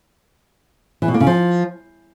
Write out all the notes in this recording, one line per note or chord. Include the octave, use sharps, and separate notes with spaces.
E3
B2
A#3
C#3
F3